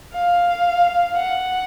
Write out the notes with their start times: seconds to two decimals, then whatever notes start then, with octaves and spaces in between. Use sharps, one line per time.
0.13 F5
1.17 F#5